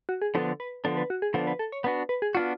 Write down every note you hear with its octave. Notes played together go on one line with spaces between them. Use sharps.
F#4
G#4
D3 F3 B3 D4 A4
B4
D3 F3 B3 D4 A4
B4
F#4
G#4
D3 F3 B3 D4 A4
B4
A4
C#5
B3 D4 F#4 B4
B4
G#4
B3 D4 F4 F#4